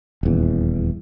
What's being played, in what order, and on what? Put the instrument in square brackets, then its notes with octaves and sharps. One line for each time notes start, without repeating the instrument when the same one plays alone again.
[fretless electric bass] D#1 E2